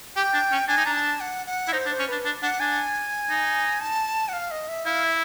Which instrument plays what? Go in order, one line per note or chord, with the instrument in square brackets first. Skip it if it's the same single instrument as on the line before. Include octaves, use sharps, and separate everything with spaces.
[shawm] G4 [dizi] G5
[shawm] D4
C#4
[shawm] D4 [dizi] G#5
[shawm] D#4
[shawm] D4 [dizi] A#5
[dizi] A5
F#5
F#5
[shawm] E4
[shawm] D#4 [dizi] C5
[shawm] D4
[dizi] C5
[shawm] C#4
[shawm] D4 [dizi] B4
[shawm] D4
[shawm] D4 [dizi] F#5
[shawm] D4 [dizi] G#5
[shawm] D#4
[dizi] A5
F#5
F5
D#5
E5
[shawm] E4 [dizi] F5
[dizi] E5